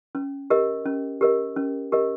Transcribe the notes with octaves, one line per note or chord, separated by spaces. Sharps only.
C#4
G4 A#4 D#5
C#4
G4 A#4 D#5
C#4
G4 A#4 D#5